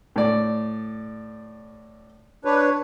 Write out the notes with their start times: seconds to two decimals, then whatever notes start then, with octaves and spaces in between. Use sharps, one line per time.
0.16 A2 D5
2.45 D4 B4 C#5